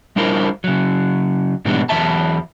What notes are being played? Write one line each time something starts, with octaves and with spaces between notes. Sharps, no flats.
G3 D4 E4 F4 A#4 C5
C#3 F#3
G#2 B2 E3 G3 B3 D4
E2 D#3 E3 F#3 E5 A5